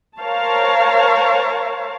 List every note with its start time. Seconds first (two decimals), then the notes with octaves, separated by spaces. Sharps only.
0.18 A#4 C5 C#5 F5 A5